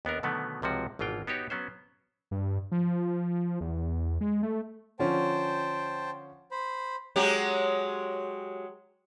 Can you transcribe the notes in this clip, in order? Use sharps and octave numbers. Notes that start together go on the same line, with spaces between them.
D#2 B3 D4 A#4
B2 D3 D#3 F#3 A3 B3
C#2 C3 F3 F#4
G#1 B2 E3 F4 G5
B3 D#4 F#4 G4 C#5
F#3 B3 C#4 C5
G2
F3
E2
G#3
A3
D3 F3 C#4 C5 G5 A5
C5 B5
F#3 G#3 G4